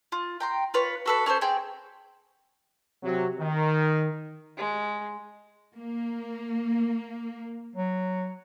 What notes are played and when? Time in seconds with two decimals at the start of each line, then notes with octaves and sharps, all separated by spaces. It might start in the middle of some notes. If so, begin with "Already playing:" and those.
0.12 F4
0.40 G5 A#5 C6
0.74 F4 B4 C#5
1.06 F#4 A4 B4
1.26 C#4 G#4 A4 C5
1.41 C4 G#4 G5
3.03 C3 F#3
3.40 D#3
4.57 G#3
5.75 A#3
7.75 F#3